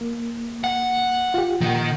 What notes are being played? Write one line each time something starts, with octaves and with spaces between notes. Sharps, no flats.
A#3
F#5
F4 G4
A#2 D#3 F#5